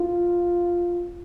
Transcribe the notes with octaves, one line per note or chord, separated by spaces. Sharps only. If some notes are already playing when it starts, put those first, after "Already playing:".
Already playing: F4